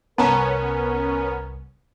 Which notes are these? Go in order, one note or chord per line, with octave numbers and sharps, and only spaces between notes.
G1 C2 B3 C#4 A#4 A5 A#5